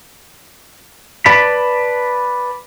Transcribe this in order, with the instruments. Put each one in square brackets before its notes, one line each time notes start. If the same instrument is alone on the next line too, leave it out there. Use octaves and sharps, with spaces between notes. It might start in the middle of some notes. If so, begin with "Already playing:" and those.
[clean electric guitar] B4 D5 A5 B5